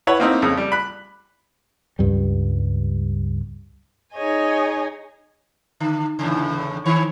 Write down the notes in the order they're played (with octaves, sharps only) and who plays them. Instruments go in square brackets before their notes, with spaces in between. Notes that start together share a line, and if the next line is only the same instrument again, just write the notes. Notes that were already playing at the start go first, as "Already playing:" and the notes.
[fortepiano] E4 B4 C#5 F#5
A#3 C4 D#4 E4
F2 C#3
G3
B5 F#6
[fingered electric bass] C#2 G2 G3
[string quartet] D#4 G#4 C#5 D#5 G#5
[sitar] D3
E2 A2 C#3
D#3 C#5